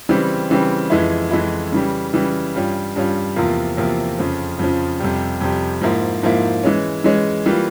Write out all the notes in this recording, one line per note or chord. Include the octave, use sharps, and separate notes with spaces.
C#3 E3 G3 C4
C#3 E3 G3 C4
F2 E3 G#3 E4
F2 E3 G#3 E4
C#3 E3 G3
C#3 E3 G3
G2 G3 C#4 F4
G2 G3 C#4 F4
E2 C3 F3 A#3 F4
E2 C3 F3 A#3 F4
F2 C#3 F3
F2 C#3 F3
F2 C3 G3
F2 C3 G3
G#2 F3 A#3 E4
G#2 F3 A#3 E4
E3 G#3 C#4
E3 G#3 C#4
E3 G3 A#3 F4